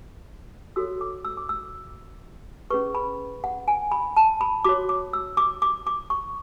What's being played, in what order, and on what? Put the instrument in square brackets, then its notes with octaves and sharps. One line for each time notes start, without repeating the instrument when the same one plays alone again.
[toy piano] F#4 A4 C#5 E6
D6
E6
D6
E6
C#4 G#4 B4 C#6
B5
F#5
G#5
B5
A5
B5
F#4 C#5 D6
D6
E6
D6
D6
D6
C#6